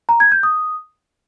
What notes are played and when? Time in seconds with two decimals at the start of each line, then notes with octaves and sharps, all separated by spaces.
0.09 A#5
0.20 G#6
0.32 G6
0.43 D#6